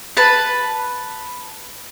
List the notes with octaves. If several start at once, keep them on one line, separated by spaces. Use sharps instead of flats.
B4 A5